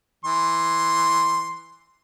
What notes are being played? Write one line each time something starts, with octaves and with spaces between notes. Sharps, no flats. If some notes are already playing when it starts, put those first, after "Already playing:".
E3 C6